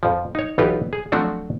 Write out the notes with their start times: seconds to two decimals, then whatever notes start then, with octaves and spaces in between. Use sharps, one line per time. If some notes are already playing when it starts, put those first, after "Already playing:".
0.03 F2 F3
0.35 D#4 C#5
0.58 B1 E3 D#4 F4 G4 B4
0.93 G#4
1.12 F3 F#3 A3 C4 D4 F#4